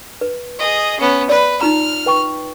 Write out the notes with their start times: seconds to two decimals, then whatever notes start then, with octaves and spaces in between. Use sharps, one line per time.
0.21 B4
0.59 G#4 D#5
0.99 B3 C#4
1.29 B4 D5
1.61 D#4 F4 A#5 F6
2.06 B4 G5 C#6